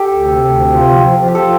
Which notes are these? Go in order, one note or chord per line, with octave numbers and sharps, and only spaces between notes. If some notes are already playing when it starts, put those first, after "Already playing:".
Already playing: G4 A4
D2
C3
D2
C3
F4
F3
F3
F3
G4
F4 A4